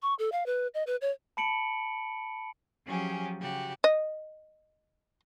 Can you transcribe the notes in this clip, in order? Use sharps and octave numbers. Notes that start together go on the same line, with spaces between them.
C#6
A4
F5
B4
D#5
B4
C#5
A5 B5 C#7 D7 F#7
F3 F#3 C#4 G4 G#4
C#3 F#4 G4
D#5